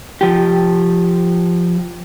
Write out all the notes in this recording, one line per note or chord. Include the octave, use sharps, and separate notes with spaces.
F3 G4